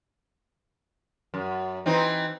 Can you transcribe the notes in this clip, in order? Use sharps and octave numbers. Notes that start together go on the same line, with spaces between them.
F#2
E3 C4 D#4